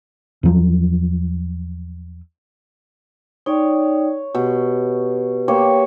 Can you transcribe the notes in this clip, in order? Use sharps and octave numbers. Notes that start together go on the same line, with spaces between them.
E2 F3 F#3
D#4 C#5 D5 G5
B2 G4
A#3 G4 C#5 G5